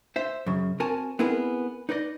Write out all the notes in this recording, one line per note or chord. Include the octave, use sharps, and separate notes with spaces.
C5 E5
F#2 C#3
C4 F#4 A#4 G#5 A5
B3 C4 E4 G#4 A#4 B4
D#4 B4 D5 D#5